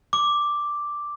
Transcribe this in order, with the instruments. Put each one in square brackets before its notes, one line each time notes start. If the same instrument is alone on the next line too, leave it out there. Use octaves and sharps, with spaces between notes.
[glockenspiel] D6